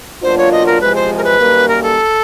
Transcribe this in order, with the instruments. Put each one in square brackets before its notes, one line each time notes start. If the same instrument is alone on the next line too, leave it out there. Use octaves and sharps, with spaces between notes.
[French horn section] B2 F#3 A#3 D4 F4 [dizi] C5
[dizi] C#5
D#5
A#4
[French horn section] E2 C3 F3 G#3 [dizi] B4
[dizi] C5
A#4
B4
[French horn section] F#2 D#3 G3 A#3
[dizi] A#4
A4